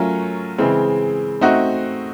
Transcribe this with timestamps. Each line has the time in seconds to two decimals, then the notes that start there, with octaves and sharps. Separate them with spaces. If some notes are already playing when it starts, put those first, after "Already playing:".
Already playing: F#3 A3 C#4 F4 A#4
0.58 C#3 E3 G#3 C4
1.41 A3 C4 D#4 F#4